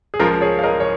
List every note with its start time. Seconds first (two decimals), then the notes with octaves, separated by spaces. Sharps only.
0.14 G#4
0.19 C#2 C#3 F3 F4 A#4
0.41 G#4 C#5
0.59 F5
0.63 A#4 D#5
0.80 C#5